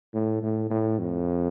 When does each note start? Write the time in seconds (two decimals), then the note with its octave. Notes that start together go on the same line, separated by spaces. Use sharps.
0.14 A2
0.43 A2
0.70 A2
0.99 F2